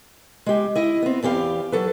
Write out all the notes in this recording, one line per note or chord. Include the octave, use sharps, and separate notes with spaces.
G#3 G4
E4 D#5
B3 C4
E2 E3 G4 C#5 F5
F#3 A4 B4